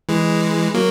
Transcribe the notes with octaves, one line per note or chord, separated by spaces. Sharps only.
E3 G#3
F#3 A#3